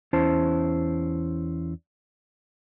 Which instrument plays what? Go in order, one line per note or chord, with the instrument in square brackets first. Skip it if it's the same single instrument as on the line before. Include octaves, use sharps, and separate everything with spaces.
[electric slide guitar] E2 C#4 E4 C5 A5